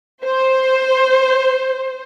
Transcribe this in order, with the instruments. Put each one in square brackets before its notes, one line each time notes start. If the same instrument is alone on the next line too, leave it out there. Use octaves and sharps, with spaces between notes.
[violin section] C5